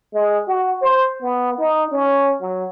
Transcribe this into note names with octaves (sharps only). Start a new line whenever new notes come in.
G#3
F#4
C5
B3
D#4
C#4
F#3